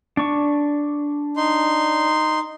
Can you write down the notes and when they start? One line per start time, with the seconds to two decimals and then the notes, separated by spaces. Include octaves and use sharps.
0.17 D4 C#6
1.37 D#4 C6